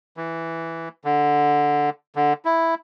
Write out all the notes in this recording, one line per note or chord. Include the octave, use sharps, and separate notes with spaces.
E3
D3
D3
E4